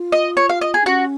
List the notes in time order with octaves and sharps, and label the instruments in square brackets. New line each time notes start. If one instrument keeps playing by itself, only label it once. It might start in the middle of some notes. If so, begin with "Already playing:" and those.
Already playing: [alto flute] F4
[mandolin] D#5
C#5
F5
D#5
G#4
[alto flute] D#4
[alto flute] C#4 [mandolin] F#4